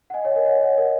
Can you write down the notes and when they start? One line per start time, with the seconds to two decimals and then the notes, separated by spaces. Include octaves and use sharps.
0.10 F#5
0.14 D#5 G#5
0.25 C#5 F#5
0.35 A#4 D#5
0.46 C#5 F#5
0.61 C#5 F#5
0.77 A#4 D#5